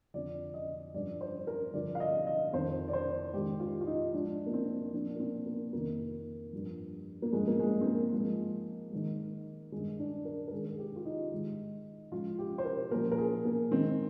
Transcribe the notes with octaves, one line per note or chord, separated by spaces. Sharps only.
F2 D3 F3 D5
D#5
G2 F3 D5
C5
A#4
G2 D3 F3 D5
F5
D#5
D#5
F2 D#3 C5
D5
C5
G#2 D#3 G4
F4
F4
D#4
D#4
G#2 F3 D4
A#3
C4
A#2 F3 D4
A#3
C4
A#3
F2 C3 D#3 A#3
G2 F3
A#3
G2 F3 G#3
A#3
G#3
C4
A#3
G#2 F3
G#2 D#3
G2 D#3 G#3
D4
A#4
A#4
G#2 D#3 G#4
G#4
G4
F4
D#4
G#2 D#3
G#2 F3 F4
G4
C5
A#4
A#2 F3 A#4
A#4
G#4
A#3
G#2 D#3 C4